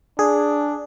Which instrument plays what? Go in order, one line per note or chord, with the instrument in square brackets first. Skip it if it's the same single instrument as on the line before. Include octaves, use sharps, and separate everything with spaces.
[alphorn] D4 [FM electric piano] G#4